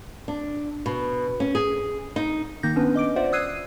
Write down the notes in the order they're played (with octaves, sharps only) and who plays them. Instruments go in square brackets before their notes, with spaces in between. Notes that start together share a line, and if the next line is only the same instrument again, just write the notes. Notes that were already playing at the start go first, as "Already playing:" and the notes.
[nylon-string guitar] D4
B2
C#4
G#4
D#4
[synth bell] D#3 A#3 D#4 G6 A#6
B3 C#4 D4 B4
D#5 D6 D7
F4 C5 D5 E5 F#5
D#6 E6 F#6 G#6 C7 D#7